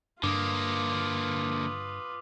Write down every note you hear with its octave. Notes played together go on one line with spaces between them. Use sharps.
G2 D3 A#3 F4 B4 D6 D#6